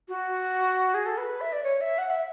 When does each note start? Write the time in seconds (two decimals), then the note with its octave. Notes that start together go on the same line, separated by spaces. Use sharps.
0.08 F#4
0.94 G#4
1.06 A4
1.17 B4
1.41 E5
1.52 D5
1.63 C#5
1.81 E5
1.98 F#5
2.10 E5